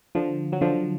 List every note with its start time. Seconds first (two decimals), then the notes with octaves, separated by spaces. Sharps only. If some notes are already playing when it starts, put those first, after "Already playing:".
0.15 D3 F3
0.52 F#3
0.61 D3 F3